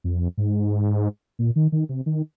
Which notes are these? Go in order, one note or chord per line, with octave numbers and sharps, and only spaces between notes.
F2
G#2
A#2
D#3
D#3
C3
D#3